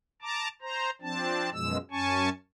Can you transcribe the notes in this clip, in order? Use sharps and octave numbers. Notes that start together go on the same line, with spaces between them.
A5 A#5 D6
C5 A#5
F3 C4 D4 A5
F#2 B2 F3 G#3 E6
F#2 C#4 G#5 A5 C#6